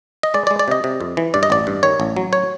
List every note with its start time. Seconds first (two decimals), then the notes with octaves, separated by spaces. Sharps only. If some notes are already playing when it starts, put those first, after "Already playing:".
0.23 D#5
0.34 G#3 D5
0.47 D5
0.51 G#3
0.59 D5
0.68 C3 D#5
0.84 C3
1.01 F2
1.17 E3
1.34 G2 D5
1.43 D#5
1.50 A1 D5
1.67 G2
1.83 D#3 C#5
2.00 A1
2.16 F#3
2.33 C#5